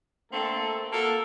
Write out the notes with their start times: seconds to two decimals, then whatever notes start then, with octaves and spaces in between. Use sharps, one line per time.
0.32 D3 A3 A#3 C4 A4
0.91 A#3 F4 F#4 A4